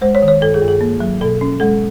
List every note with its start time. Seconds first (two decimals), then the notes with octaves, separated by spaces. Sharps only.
0.01 G#3 C5
0.15 C#5
0.22 D#3
0.28 C#5
0.41 G2 A4
0.54 G#4
0.62 G2
0.68 G#4
0.81 A#3
1.00 F#3
1.21 B2 A4
1.41 C#4
1.60 G#3 A4